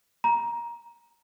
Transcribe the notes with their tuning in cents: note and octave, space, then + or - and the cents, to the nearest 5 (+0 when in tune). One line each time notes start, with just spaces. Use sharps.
A#5 +15